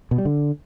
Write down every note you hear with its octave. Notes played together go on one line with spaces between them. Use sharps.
B2
G3
D3